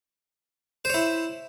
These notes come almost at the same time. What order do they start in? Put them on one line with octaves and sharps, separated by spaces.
C5 C#5 E4